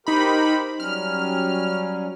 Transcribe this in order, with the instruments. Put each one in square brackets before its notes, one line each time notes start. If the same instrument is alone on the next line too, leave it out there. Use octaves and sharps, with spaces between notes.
[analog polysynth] D#4 B5 [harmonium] G4 A#4 C5
[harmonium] F#3 G3 C#4 [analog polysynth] F6